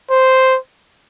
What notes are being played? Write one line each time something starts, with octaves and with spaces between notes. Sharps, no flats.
C5